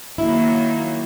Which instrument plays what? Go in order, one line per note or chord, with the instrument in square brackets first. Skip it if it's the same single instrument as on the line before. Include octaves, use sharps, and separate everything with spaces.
[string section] D#3 F#3 A#3 [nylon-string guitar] E4